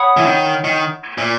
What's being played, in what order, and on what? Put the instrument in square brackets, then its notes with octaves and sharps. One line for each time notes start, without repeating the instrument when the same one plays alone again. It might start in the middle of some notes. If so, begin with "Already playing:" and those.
Already playing: [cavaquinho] C#5 F#5 B5 D#6
[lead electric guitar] E3
D#3
D#3
A#2